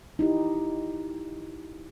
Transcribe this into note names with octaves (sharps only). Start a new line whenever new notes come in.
D#4 E4 G4